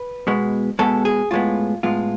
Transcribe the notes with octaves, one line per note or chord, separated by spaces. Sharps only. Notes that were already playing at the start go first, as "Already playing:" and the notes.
Already playing: B4
B2 G#3 B3
B2 G#3 B3 A4
G#4
A2 G#3 B3 F4
A2 G#3 B3 F4